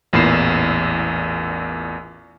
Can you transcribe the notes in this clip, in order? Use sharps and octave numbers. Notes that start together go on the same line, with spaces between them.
A1 E2 A#2 B5 C7 E7